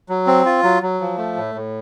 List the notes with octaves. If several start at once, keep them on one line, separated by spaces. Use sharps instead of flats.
F#3
C4
F4
F#3
F#3
F3
A3
A2
A2